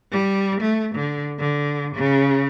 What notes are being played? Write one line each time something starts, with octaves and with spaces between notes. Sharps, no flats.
G3
A3
D3
D3
C#3